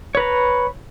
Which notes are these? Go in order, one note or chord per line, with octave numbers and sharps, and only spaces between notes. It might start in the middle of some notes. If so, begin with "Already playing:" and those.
B4 C#5 A#5